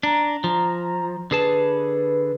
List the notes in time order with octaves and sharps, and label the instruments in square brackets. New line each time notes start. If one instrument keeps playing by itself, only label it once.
[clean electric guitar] D4 [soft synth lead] A#5
[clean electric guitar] F3
[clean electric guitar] D3 G#4 A5 [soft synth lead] B4